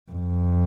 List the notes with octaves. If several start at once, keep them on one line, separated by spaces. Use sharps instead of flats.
F2